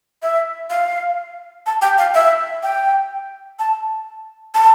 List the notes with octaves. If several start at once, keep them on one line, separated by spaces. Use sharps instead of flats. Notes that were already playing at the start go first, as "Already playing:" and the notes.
E5
F5
A5
G5
F5
E5
G5
A5
A5